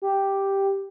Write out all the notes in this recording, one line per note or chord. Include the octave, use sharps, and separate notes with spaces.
G4